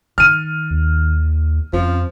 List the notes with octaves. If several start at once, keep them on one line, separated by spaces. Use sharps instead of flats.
D#3 F6 D#7
D#2
F2 F3 C#4